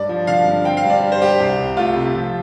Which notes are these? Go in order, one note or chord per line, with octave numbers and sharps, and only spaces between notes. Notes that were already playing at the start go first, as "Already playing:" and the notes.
Already playing: G2 D5
F3
D3 F5
G2
C4 G5
F5
G2
D5
G3
C5
G3 G4
C2 G4
C2
A3 F4
C3
F3